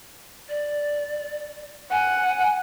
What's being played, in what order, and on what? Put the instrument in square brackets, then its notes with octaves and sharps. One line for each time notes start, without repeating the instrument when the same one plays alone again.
[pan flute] D5
[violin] F#5 [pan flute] G#5